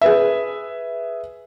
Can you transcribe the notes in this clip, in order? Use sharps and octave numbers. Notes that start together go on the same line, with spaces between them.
G#4 B4 E5